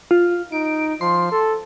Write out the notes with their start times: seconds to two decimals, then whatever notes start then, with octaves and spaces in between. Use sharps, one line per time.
0.11 F4
0.52 D#4 D7
1.01 F3 C6
1.32 A4